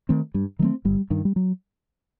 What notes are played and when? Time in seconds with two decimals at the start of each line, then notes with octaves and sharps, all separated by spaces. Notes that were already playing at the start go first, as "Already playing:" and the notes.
0.09 D#3 A3 C4
0.34 G2 G3
0.59 D#3 F#3 A3 C4
0.85 G1 G3
1.10 G2 D#3
1.25 G3
1.36 F#3